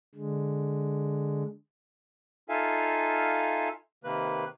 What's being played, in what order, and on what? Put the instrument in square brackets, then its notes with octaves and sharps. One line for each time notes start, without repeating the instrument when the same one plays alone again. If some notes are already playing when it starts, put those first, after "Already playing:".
[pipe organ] D3 G#3
[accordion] D#4 F4 A4 E5 F5 G#5
C3 D#3 A#3 B4 F#6